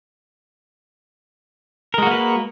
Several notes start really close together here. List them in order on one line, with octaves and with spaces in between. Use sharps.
A#4 G#3 F#4 A#3 B4